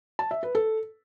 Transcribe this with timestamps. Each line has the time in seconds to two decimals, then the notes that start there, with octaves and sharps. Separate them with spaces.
0.19 A5
0.31 E5
0.43 B4
0.55 A4